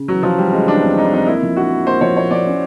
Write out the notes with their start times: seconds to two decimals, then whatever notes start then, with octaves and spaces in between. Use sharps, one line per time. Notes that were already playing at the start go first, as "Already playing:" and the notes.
Already playing: C#3
0.08 E3 F#3
0.23 E3 F3
0.38 E3 G3
0.52 C#3 G#3
0.68 E3 D4
0.82 F2
0.97 E3 D#4
1.05 D4
1.13 F2 D#4
1.27 A#3 E4
1.42 F3
1.57 D4 F#4
1.71 A#3
1.86 A#3 C5
2.01 F3 C#5
2.17 A#3 C#5
2.31 F3 D5
2.46 C#4